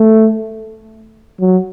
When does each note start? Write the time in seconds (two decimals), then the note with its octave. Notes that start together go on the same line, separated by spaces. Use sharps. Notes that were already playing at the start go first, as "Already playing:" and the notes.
Already playing: A3
1.41 F#3